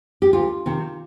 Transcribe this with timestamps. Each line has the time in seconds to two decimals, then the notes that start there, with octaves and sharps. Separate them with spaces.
0.22 G4
0.33 D2 F4
0.66 C3 D#3